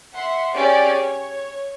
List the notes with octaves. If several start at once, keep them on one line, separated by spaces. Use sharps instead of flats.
E5 F#5 C6
C#4 G4 G#4 D5
C#5